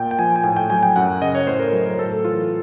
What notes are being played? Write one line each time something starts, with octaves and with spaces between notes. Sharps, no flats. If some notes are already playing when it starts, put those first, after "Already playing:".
Already playing: A#2 G5
G5
F3 G#5
G#5
A2 G5
G5
F#3 G#5
G5
F#2 F#5
C#3 D#5
C#5
A2 C5
A#4
F#3
A#4
A2 A4
E3 F4